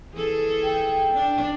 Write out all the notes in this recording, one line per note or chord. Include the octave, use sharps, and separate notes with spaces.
E3 G#4 A4
G5
D4